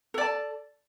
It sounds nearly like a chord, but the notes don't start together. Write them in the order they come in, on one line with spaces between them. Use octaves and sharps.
A4 D5 A5